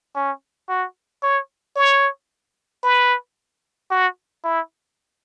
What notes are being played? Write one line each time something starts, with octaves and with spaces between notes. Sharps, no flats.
C#4
F#4
C#5
C#5
B4
F#4
E4